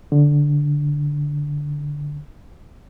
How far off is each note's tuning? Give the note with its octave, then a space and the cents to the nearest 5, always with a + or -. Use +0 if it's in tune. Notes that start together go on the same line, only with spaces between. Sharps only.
D3 -5